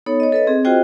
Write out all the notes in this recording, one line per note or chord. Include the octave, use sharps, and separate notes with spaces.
B3 D#4 A4 C#5
C#5 D#5
A4 B4 D#5
C4 G#4
F4 F#4 G#4 C5 D#5 G5